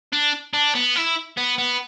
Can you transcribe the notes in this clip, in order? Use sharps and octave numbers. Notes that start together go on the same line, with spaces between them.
D4
D4
B3
E4
B3
B3